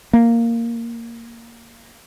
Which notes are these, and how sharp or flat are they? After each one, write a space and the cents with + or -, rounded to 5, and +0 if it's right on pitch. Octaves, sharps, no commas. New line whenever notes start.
A#3 -5